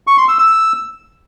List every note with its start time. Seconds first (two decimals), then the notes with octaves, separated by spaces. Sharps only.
0.07 C#6
0.18 C6
0.28 E6
0.39 E6